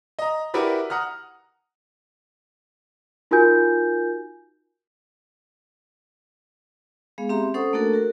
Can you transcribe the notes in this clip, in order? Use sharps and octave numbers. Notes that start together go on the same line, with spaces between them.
D#5 A#5
E4 F#4 G4 A#4 B4 D5
F#5 A#5 D#6 F6
D#4 F4 F#4 A#4 G#5 G6
G#3 B3 G#4 F5
C4 G4 E5 A#5 C6
C#4 A4 C5 F#5 C#6 D#6
A3 A#3 D4 F#4 A4 A#4
F#4 A#4